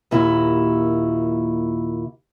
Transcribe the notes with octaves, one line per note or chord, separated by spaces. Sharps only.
D#2 A#2 E4 F#4